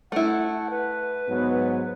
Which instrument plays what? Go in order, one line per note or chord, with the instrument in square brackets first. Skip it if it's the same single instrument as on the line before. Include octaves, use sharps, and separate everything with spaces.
[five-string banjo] A3 E4 [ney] F#5
[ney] B4
[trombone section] G#2 F#3 B3